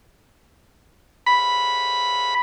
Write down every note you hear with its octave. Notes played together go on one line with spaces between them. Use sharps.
B5